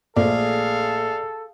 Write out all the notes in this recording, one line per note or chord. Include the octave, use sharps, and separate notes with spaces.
A#1 A3 G#4 A4 D5 F5